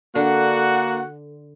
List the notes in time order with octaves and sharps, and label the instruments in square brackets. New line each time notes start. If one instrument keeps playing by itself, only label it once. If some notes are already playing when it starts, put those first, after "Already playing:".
[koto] D3 [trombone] A#3 [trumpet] F#4 [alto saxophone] F#5